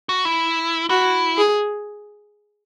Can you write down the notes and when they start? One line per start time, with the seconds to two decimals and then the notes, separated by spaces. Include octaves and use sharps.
0.09 F#4
0.25 E4
0.89 E4 F#4
1.38 G#4